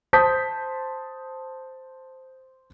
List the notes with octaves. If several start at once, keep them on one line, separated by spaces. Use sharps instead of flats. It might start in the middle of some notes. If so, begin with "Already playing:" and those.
C5 A5 D#6 G6 B6